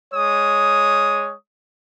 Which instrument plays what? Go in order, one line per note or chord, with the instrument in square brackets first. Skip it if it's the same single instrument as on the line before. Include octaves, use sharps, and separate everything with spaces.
[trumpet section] G#3 C#5 D#6